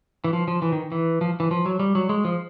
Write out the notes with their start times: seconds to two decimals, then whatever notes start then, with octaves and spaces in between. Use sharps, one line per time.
0.24 E3
0.33 F3
0.48 F3
0.62 E3
0.72 D#3
0.92 E3
1.21 F3
1.40 E3
1.51 F3
1.66 F#3
1.80 G3
1.95 F#3
2.09 G#3
2.25 F3